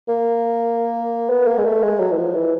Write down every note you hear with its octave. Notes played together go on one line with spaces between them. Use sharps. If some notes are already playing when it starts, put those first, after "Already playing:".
A#3
B3
A#3
G#3
A3
G#3
F#3
E3
F3
E3